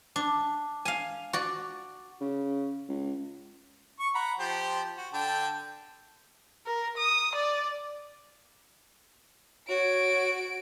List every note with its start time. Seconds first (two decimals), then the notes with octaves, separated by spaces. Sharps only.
0.16 D4
0.85 F5 G#5
1.33 F#4 D5
2.21 C#3
2.89 C#2
4.00 C#6
4.15 F#5 A#5 B5
4.39 F3 G4 C5
4.97 F#4
5.13 D3 G5 A5
6.66 A#4
6.97 D#6
7.35 D5
9.69 F#4 C#5 D7